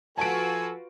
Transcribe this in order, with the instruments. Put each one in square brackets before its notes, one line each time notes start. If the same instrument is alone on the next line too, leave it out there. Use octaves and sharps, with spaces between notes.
[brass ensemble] F3 A4 [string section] F4 F#4 B4 [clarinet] G#5 [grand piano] A5 D7